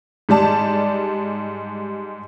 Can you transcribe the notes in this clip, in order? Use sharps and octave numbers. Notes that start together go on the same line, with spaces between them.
G#2 G3 D5 A5